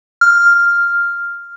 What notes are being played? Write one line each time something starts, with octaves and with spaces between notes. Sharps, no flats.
F6